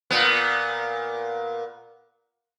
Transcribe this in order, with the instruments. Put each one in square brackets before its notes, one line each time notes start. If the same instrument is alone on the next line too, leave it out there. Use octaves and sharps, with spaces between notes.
[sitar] A#2 B3